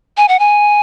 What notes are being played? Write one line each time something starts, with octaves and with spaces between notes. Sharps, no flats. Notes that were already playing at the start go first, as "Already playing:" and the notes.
G#5
F#5
G#5